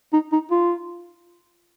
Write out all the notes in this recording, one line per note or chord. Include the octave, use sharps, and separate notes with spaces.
D#4
D#4
F4